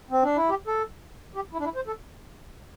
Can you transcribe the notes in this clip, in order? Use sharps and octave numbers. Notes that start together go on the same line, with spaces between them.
C4
D4
E4
G4
A4
G4
E4
D4
E4
C5
A4